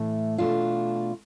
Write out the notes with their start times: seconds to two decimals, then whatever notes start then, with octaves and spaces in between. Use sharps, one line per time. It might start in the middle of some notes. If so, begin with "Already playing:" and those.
Already playing: A2 E3 A3
0.38 B2 A3 D4 F4